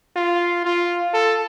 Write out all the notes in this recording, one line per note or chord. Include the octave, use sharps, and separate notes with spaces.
F4
F4
A4